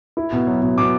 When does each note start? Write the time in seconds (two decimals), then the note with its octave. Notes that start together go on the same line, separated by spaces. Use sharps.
0.17 E4
0.32 B2
0.47 F#3
0.62 B2
0.78 B2 D6